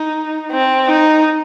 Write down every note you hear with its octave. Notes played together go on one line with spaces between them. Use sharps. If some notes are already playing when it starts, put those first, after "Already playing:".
Already playing: D#4
C4
D#4